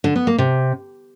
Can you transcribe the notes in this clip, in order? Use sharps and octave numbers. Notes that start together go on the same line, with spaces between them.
D3
B3
A#3
C3